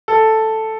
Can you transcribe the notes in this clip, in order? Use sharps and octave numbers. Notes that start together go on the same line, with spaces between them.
A4